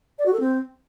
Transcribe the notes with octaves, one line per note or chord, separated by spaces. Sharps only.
D5
F#4
A4
C4